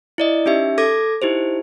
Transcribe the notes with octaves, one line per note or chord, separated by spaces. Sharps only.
E4 D5 D#5
C#4 D#4 G4 E5
A4 D6 G#6 A#6
D#4 E4 G4 C5